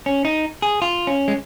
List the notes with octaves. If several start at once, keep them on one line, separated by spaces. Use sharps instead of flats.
C#4
D#4
G#4
F4
C#4
G#3